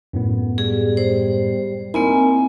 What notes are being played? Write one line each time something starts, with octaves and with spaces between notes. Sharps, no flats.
F#2 A2 B3
G3 G#4
C5
A#3 C4 D#4 E4 A#4 G#5